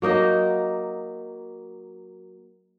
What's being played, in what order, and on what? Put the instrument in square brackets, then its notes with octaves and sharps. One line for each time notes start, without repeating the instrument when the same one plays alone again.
[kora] F#3 A#3 D#4 D#5